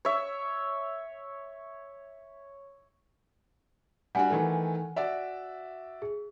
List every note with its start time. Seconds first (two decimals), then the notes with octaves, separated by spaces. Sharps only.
0.05 C#5 E5
4.15 G3 D4 F#4 F#5 G#5
4.30 D#3 E3 A3
4.96 F#4 D5 E5
6.02 G#4